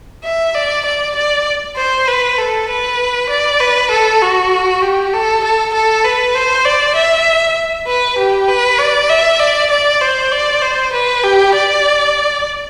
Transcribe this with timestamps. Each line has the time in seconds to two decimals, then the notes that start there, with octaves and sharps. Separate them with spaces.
0.24 E5
0.55 D5
0.86 D5
1.16 D5
1.77 C5
2.08 B4
2.39 A4
2.69 B4
3.30 D5
3.60 B4
3.91 A4
4.22 F#4
4.82 G4
5.13 A4
5.44 A4
5.74 A4
6.04 B4
6.35 C5
6.65 D5
6.96 E5
7.87 B4
8.18 G4
8.49 B4
8.79 D5
9.10 E5
9.40 D5
9.71 D5
10.01 C5
10.32 D5
10.62 C5
10.93 B4
11.24 G4
11.54 D5